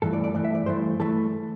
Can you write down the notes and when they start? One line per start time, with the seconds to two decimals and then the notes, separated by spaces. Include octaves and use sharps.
0.02 G2 E3 A3 A4
0.13 D5
0.24 D5
0.34 G2 E3 A3 D5
0.44 E5
0.55 D5
0.66 G2 E3 A3 C5
1.00 E3 A3 A4